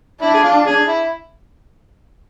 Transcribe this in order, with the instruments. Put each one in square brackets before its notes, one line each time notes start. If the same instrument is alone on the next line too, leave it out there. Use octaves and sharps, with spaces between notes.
[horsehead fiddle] D4 [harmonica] E4
[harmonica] G#4
F4
G#4
E4